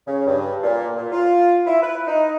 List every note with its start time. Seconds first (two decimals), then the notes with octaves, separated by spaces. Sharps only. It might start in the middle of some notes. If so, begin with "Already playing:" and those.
0.07 C#3
0.27 G2
0.64 A#2
0.97 A#2
1.12 F4
1.67 E4
1.83 B4
2.07 D#4